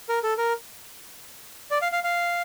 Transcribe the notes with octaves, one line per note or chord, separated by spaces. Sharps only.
A#4
A4
A#4
D5
F5
F5
F5